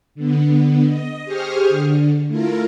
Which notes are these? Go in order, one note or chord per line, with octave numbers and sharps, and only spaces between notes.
D3 B3
D#5
G4 G#4 C5 C#6 D#6 F6
D3
A3 E4 F4 A#4